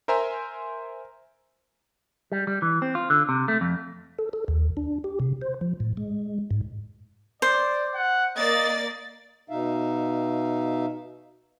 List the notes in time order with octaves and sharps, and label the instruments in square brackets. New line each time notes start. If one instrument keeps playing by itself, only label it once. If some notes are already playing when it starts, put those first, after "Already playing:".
[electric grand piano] A#4 C5 E5 G#5 A#5 C6
[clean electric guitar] G3
G3
E3
C4
F4
D3
C3
A3
F2
[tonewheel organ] A4
A4
D#2
D4
G4
C3
C5
F3
A2
G#3
G#2
[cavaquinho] C5 [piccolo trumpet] D5
[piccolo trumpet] F#5
[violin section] A#3 D5 A6 [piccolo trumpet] D#5
[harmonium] B2 D#4 E5 F5